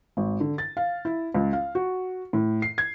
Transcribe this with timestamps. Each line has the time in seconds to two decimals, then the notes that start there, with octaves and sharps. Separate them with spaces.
0.17 G#1
0.40 D3
0.58 A6
0.77 F5
1.05 E4
1.34 C#2
1.53 F5
1.75 F#4
2.33 A2
2.62 C7
2.78 G#6